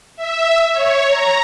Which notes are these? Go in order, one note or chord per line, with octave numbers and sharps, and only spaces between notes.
E5
C#5
A#5